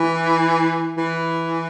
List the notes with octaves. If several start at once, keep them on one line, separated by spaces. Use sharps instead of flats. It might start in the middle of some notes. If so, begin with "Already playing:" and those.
Already playing: E3
E3